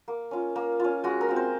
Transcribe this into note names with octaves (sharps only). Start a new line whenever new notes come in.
A#3
C#4 F4
A#3
C#4 F4
G#3 F#4
A#4
C4 F4
C5